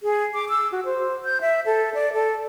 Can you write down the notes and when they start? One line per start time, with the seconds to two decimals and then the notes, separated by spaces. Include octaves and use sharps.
0.03 G#4
0.34 D6
0.49 E6
0.72 F#4
0.85 C5
1.25 G6
1.41 E5
1.66 A4
1.94 D5
2.13 A4